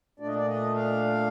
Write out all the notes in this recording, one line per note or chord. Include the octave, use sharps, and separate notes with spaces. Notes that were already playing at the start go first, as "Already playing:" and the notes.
A#2 A3 D4 D5
D#5
D5
D#5
F5